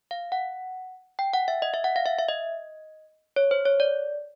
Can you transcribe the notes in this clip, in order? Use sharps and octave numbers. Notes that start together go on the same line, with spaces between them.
F5
F#5
G5
F#5
E5
D#5
E5
F#5
F5
E5
E5
D#5
C#5
C5
C#5
D5